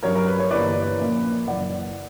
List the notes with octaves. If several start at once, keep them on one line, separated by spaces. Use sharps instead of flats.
G2 F#3 C#4 A#4 C#5
A#4
B4
C#5
G1 G2 E3 A#3 B4 D5
A#1 A#2 A#3 C#4
F#2 C#3 E3 A#3 D5 F#5